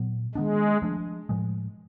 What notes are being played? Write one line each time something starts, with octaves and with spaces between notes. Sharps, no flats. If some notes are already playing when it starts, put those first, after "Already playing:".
Already playing: A#2 F#3 B3
D#3 F#3 G#3 B3 D4
F3 A3 D4
A2 F3 G#3